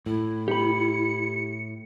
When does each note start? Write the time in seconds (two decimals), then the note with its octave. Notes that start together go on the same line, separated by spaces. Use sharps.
0.06 A2 E4
0.48 G4 B5 C#7